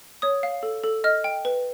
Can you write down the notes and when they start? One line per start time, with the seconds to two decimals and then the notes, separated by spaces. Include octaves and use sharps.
0.22 C#5 D#6
0.43 F5
0.63 A4
0.84 A4
1.04 D#5 F6
1.24 G5
1.45 B4